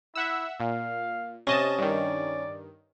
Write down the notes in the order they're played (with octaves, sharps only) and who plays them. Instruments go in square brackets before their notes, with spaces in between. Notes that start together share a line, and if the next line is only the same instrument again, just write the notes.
[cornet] E4 [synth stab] E5 F#5 E6
[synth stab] A#2 [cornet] F5
[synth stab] C3 D#5 A5 [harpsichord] C#4
[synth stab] G2 D#3 [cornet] D5